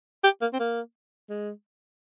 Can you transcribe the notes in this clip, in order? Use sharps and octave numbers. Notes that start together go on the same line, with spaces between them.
G4
A#3
C4
A#3
G#3